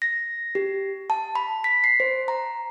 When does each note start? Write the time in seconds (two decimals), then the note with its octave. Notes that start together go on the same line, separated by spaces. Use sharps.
0.02 A#6
0.55 G4
1.10 A5
1.35 B5
1.64 B6
1.84 C7
2.00 C5
2.28 A#5